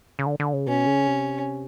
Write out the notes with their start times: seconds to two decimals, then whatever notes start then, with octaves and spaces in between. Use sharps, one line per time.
0.19 C#3
0.26 D3
0.40 D3
0.53 C#3
0.67 B2 C#4
0.86 C#3
1.07 C3